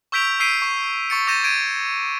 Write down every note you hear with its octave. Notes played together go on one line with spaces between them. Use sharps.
C#6 E6 G6 B6 D7 F7
E6 B6 C7 D7 D#7
C#6
C#6 A6 C#7
D6 G6 A6 A#6 D#7 E7
G#6 D7 D#7